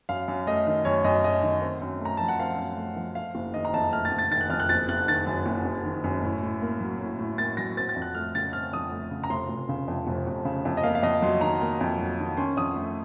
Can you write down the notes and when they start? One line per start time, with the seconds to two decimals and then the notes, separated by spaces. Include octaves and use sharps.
0.09 F#2 F5
0.28 F#2
0.47 A3 D#5
0.67 D#3
0.85 F#2 C#5
1.04 F#2 D#5
1.24 A3 D#5
1.42 D#3
1.62 C4
1.82 F#2
2.01 A3 A#5
2.17 F3 A5
2.28 F#5
2.39 C4 F5
2.58 F#2
2.77 A3
2.96 F3
3.15 A3 F5
3.35 F#1
3.54 D#3 D#5
3.65 A#5
3.74 F2 A5
3.93 A3 F6
4.05 A6
4.12 F#1
4.18 A6
4.30 D#3 A6
4.41 F#6
4.50 F2 F6
4.60 F#6
4.69 F#1 A6
4.89 F#1 F#6
5.08 D#3 A6
5.26 F#2
5.46 F#1
5.65 F#1
5.85 D#3
6.04 F#2
6.23 A2
6.43 A2
6.62 A#3
6.81 F#3
7.00 A2
7.19 A2
7.38 A#3 A6
7.57 F#3 A#6
7.77 C4 A6
7.89 A6
7.96 F2
8.02 F#6
8.15 A3 F6
8.35 C#3 A6
8.53 C4 F6
8.73 F2 D#6
8.92 A3
9.11 C#3
9.24 A#5
9.30 F1 C6
9.49 F1
9.69 C#3
9.88 F2
10.07 F1
10.27 F1
10.45 C#3
10.65 F2
10.77 D#5
10.83 A#3 F5
10.95 F5
11.03 F2 D#5
11.22 F#3 C6
11.41 D#3 A#5
11.61 A#3
11.81 F2
11.99 F#3
12.19 D#3
12.37 C#4 C6
12.57 F2 D#6
12.76 A3